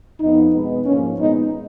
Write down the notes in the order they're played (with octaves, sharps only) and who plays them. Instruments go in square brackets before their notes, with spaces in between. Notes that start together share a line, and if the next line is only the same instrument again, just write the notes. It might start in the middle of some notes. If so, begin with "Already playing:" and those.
[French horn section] F2 F3 B3 D#4
B2 G#3 B3
G#2 F3 A#3 C#4
A#2 G#3 B3 D#4